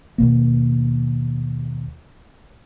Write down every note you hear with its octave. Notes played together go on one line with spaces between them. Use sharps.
D#2 B2 A#3